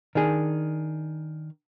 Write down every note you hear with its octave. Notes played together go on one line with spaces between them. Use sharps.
D#3 D4 G#4